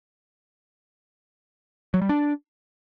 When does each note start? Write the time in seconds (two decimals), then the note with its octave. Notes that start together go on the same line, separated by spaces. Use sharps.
1.94 F#3
2.02 G3
2.09 D4